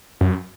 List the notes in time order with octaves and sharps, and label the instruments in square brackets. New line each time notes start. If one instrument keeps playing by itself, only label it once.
[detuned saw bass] F#2